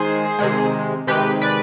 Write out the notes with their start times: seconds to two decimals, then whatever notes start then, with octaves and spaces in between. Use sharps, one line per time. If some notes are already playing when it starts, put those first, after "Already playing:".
Already playing: D#3 G#3 G#4 C5
0.39 C3 D#3 G#3
1.07 C3 D#3 G#3 G4 B4
1.42 B4 D5